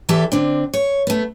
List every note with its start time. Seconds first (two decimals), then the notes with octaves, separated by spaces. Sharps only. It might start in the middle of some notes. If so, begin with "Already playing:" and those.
0.09 E2 E3 G4 A4 E5
0.32 D3 C4 D4
0.74 C#5
1.07 A3 B3